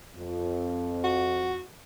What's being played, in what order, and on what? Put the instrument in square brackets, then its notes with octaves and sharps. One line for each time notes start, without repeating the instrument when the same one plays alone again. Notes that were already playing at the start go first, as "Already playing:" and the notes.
[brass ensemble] F2
[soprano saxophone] F#4